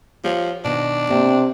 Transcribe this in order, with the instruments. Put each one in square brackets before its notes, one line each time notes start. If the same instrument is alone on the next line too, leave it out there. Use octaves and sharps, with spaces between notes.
[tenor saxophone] F3 [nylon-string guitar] G4 C#5 F#5
[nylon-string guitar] B2 D#3 [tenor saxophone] D4
[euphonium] C3 [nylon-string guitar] A#3 C4 D5